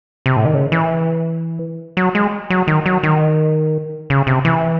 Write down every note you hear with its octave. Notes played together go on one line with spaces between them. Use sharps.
C3
A2
D#3
C#3
E3
F#3
G#3
F#3
D#3
F#3
D#3
C#3
C3
E3